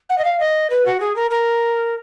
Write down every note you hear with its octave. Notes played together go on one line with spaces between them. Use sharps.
F#5
D#5
F5
D#5
B4
F#4
G#4
A#4
A#4